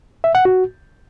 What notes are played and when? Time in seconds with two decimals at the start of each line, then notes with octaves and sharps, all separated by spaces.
0.24 E5
0.35 F#5
0.45 F#4